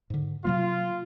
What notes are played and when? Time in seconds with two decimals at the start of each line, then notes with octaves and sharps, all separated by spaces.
0.10 G#2 D3
0.45 C3 F#3 A#3 F4